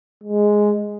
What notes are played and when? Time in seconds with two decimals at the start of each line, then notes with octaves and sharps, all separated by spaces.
0.24 G#3